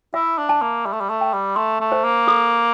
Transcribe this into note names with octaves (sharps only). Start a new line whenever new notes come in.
E4 E5
D4
A5
A#3
G3 E5
A3
G3
A3
G5
G3
A3 C6
A3
C5
A#3
A4